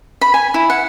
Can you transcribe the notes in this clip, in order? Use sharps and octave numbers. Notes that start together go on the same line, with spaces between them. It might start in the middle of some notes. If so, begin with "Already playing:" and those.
B5
G#5
E4
F#5